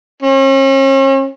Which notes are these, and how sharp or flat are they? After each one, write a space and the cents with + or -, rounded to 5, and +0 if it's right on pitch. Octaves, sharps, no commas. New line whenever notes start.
C#4 -40